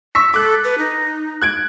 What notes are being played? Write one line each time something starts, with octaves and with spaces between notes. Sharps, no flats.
C#6 E6 B6
A4 D6 F#6
B4
D#4
F#6 G#6 D7